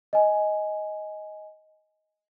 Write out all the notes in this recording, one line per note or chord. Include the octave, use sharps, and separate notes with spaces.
D#5 G#5